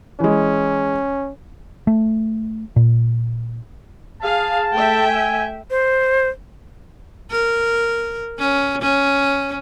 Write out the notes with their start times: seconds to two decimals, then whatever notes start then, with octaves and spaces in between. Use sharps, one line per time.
0.20 E3 G#3 C#4
1.87 A3
2.76 A#2
4.22 G#4 F5 A5
4.74 A3 E5 G5
5.07 G#5
5.70 C5
7.31 A#4
8.38 C#4
8.82 C#4